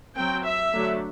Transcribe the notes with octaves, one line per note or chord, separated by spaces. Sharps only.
F#3 C4 G5
E5
D3 F#3 A3 D4